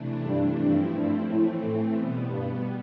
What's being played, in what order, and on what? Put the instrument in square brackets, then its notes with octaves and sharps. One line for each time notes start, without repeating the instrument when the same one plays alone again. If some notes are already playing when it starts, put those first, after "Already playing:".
Already playing: [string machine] C3 E3 A3 D4
[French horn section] G2
[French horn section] G2 [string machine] F3 A3 C4 E4
[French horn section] G2
[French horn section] A2 [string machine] E3 A3 C4
[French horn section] A2
[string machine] B2 G3 B3
[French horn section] G2